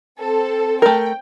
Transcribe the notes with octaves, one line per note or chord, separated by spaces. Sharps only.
C4 A4
A3 A#4 G5